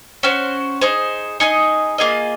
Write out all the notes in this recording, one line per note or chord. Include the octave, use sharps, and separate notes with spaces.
C#4 F#4 C5
D#4 G#4 C5
D#4 G#4 D#5
A#3 F4 G#4 D#5